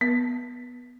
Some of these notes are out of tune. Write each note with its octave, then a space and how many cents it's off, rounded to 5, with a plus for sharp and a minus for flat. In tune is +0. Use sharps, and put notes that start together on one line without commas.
B3 +0 B4 -30